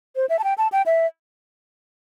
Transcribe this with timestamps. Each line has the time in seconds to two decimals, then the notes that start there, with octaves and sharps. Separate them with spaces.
0.16 C5
0.29 E5
0.39 A5
0.44 G5
0.58 A5
0.72 G5
0.86 E5